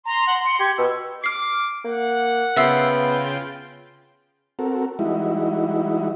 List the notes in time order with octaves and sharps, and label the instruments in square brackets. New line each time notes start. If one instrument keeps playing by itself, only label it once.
[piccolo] A#5 [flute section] C6
[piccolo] F#5
C#7
[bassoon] G4 [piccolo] G#6
[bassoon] B2 [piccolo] E6
[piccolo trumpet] D6 [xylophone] F6 C7
[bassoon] A#3 [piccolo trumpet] F#5
[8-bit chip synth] C#3 F4 G5 [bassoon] B3 [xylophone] E5 E6 C7
[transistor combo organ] C4 F#4 A4 A#4
E3 G3 G#3 D#4 E4 F#4